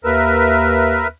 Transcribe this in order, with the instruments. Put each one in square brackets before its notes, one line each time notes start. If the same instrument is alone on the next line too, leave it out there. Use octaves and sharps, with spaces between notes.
[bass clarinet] D#2 [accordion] A#4 B4 E5